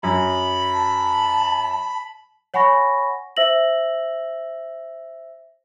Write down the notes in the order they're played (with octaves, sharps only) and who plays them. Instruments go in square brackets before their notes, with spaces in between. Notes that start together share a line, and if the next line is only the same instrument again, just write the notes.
[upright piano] F#2 [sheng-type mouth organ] B5
[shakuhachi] A5
[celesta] C#5 F#5 G#5 B5 C#6 A#6
C5 E5 E6 A#6 F#7